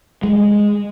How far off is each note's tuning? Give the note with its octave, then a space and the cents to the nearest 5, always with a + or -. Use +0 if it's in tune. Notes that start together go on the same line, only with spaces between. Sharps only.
G#3 -5